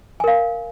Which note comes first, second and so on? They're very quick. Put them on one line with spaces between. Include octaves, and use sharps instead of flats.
G#5 A#4 F5